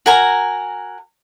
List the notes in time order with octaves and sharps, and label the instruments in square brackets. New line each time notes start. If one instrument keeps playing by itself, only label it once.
[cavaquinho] F#4 A#4 G#5 A#5